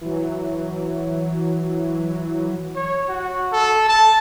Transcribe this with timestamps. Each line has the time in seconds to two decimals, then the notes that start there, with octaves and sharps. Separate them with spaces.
0.01 E3 F#3
2.75 C#5
3.09 F#4
3.52 A4
3.89 A5